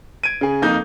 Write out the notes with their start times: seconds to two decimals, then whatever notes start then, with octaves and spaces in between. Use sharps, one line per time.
0.23 G#6 D7 D#7
0.41 C#3 G#4
0.62 F2 A#3 D#4 G6